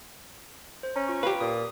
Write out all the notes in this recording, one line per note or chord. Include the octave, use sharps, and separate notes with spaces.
C5
C#4 A#5
F4 C#6
G4 B4 F5 B6
A#2 D#6